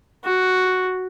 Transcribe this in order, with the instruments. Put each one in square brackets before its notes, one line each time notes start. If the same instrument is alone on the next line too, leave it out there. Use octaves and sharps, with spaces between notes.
[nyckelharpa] F#4